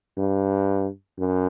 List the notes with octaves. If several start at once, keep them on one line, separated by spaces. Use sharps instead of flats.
G2
F#2